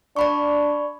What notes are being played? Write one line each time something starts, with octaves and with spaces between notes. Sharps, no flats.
D4 D5 B5 C#6